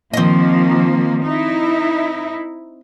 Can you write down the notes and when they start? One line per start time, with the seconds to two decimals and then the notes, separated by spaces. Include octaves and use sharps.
0.14 D#3 F3 A#3 C4 D#5
1.25 D#4 E4